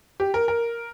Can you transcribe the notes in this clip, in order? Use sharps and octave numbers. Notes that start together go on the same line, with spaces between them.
G4
A#4
A#4